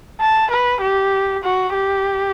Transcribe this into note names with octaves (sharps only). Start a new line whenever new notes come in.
A5
B4
G4
F#4
G4